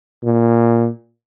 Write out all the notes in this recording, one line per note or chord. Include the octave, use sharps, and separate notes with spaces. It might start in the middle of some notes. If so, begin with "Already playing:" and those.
A#2